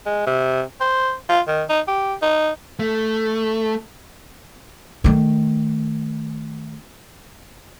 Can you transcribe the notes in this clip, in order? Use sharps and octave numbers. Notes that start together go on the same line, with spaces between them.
G#3
C3
C5
F4
D#3
D#4
G4
D#4
A3
D#3 A3